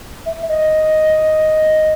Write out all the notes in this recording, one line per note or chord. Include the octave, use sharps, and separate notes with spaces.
E5
D#5